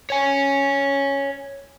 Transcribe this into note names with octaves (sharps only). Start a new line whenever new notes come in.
C#5 G#5